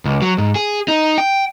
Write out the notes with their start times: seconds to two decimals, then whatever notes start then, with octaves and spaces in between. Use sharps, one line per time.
0.05 C#2
0.22 F#3
0.38 G#2
0.56 G#4
0.88 D#4
1.18 G5